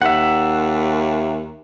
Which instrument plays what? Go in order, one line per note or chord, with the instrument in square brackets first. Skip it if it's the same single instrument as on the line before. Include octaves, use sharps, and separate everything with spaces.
[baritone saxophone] D#2 [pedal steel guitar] E5 F#5